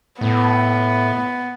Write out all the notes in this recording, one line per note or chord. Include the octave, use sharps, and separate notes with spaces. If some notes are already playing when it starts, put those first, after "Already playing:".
A2 B3